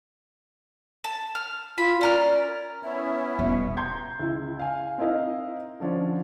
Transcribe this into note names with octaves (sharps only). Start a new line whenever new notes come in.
A5
F6
F4 B5
C#4 A#4 D5 F6
B3 C#4 E4 E5
D#1 B2
A#5 C6 G6 G#6
C#2 E4
F5 G#5
C4 D#4 E4 A#4 D#5 F5
D3 F3 C#4 D4